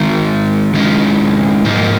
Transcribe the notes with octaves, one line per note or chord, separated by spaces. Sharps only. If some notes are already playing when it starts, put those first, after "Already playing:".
Already playing: D#3 G#3 D#4
D#3 G#3 C#4 F4
G#2 F3 A#3 D#4